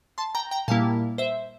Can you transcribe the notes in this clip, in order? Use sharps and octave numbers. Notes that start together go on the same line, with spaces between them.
A5 C6
G5 A#5
G5 A#5
A#2 G3 A#3 E4 F5 A5
C5 E5